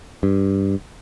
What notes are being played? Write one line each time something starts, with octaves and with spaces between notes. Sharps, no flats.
G2